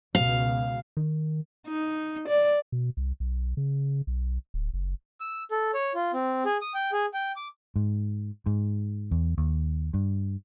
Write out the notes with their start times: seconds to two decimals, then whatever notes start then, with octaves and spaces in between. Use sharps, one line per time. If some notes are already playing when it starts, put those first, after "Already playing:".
0.15 C#2 B2 F5
0.97 D#3
1.68 D#4
2.28 D5
2.72 B2
2.97 C2
3.20 B1
3.57 C#3
4.07 B1
4.54 D1
4.74 F#1
5.21 E6
5.51 A4
5.74 C#5
5.95 F4
6.14 C4
6.45 G#4
6.62 D#6
6.74 G5
6.92 G#4
7.14 G5
7.36 D6
7.76 G#2
8.46 G#2
9.11 E2
9.38 D#2
9.94 G2